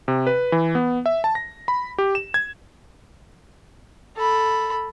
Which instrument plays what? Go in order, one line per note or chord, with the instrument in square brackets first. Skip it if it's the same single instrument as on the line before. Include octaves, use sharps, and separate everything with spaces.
[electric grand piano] C3
B4
E3
B3
E5
A5
A#6
B5
G4
E7
G#6
[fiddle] A4 B5